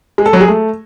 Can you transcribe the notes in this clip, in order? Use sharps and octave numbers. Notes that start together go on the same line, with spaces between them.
G#3
A4
F#3
G#4
A3